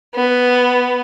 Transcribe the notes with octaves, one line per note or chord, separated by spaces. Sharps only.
B3